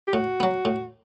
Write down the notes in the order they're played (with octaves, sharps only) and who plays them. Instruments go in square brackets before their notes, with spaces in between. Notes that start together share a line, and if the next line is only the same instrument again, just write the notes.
[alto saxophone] G4
[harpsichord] A2 [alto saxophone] F#4
[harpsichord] F#3 B3
A2